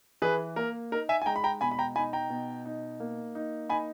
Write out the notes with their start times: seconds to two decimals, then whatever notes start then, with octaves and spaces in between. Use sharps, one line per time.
0.22 E3 G#4 B4
0.56 A#3 A#4
0.92 D#4 A#4
1.09 E5 G#5
1.22 G#5
1.26 G#3 G5 A#5
1.36 B5
1.44 G5 A#5
1.61 B2 G#5 B5
1.71 B5
1.79 G5 A#5
1.95 D#4 G#5 B5
2.13 G5 A#5
2.30 B2
2.65 D#4
3.00 A#3
3.35 D#4
3.70 D#4 G#5 B5